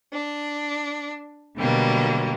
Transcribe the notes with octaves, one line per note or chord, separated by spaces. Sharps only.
D4
B2 D3 F#3 G3 A#3